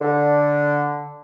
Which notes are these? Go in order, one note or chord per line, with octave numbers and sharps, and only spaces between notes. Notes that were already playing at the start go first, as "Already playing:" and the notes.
D3